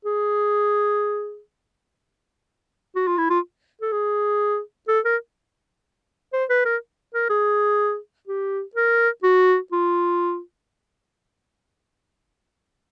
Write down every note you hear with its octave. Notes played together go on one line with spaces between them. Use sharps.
G#4
F#4
F4
E4
F4
A4
G#4
A4
A#4
C5
B4
A#4
A#4
G#4
G4
A#4
F#4
F4